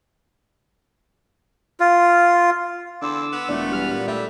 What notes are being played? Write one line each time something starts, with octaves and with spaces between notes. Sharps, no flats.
F4
E2 D3 C6 D6 E6
B3
E1 A#2 D3 A3 D5
G2 E3 G3 G4 F6
A#2
G3 A3 E5